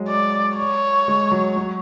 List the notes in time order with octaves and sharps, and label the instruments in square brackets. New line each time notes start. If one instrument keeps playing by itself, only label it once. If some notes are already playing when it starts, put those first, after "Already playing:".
Already playing: [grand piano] F#3 G#3
[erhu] D5
C#5
[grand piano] G#3
F#3
F#3